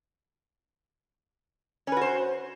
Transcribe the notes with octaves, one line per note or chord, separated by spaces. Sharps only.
C#4 F#4 B4 C5